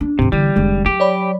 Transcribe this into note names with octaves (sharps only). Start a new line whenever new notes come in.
D4
D#2 G#2 C3
G1 D3 E3 G3
F1 D3 E3 G#3
F#3 G4
C#5 D5 B5